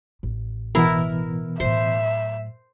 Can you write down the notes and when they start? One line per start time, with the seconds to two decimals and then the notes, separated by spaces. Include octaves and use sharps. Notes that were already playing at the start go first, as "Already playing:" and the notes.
0.23 A1
0.75 B2 E3 B3 E4 A#4
1.60 A2 F#3 C5 E5